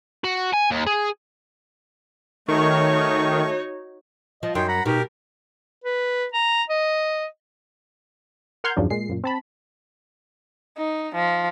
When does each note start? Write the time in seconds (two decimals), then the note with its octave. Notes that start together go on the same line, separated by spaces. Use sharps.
0.24 F#4
0.54 G#5
0.71 D#2
0.87 G#4
2.48 D#3 A3 D#4 F#4 C#5 C#6
4.43 F3 D#5
4.55 F#2 D#4 G5 C6
4.68 F#5 A#5 B5
4.86 B2 D#4 G4 A#4
5.84 B4
6.34 A#5
6.70 D#5
8.64 A#4 F#5 C6 F6 G6 G#6
8.76 E2 G2 C#3 F3 F#3 D4
8.90 A#2 G#3 C7
9.09 F#2 A#2
9.24 C4 A5 B5
10.77 D#4
11.15 F3